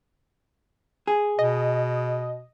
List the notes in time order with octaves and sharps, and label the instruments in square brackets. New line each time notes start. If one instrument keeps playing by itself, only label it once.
[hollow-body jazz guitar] G#4
[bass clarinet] B2 [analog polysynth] D#5